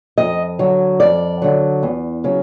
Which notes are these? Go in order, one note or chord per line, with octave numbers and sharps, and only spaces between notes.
F2 D#5
D3 F#3
F2 D5
D3 F#3
E2
C#3 F#3